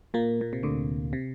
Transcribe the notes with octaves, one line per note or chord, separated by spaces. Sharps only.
A#2 A#3
A#2
C3
D2 D3
C3